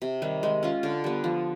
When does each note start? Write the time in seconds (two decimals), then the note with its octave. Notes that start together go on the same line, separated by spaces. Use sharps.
0.02 C3
0.22 D#3 G3
0.43 G#3
0.63 C#4 F4
0.83 D3
1.04 G3 B3
1.24 F3